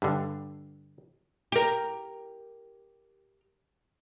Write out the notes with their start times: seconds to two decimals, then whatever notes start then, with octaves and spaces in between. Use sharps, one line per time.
0.02 G2 D3
1.52 G4 A#4